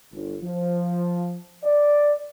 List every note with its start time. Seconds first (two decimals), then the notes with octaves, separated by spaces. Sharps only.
0.13 G1
0.43 F3
1.64 D5